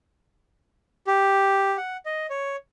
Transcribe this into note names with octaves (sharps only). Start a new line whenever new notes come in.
G4
F#5
D#5
C#5